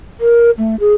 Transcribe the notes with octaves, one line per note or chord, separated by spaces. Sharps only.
A#4
A3
G#4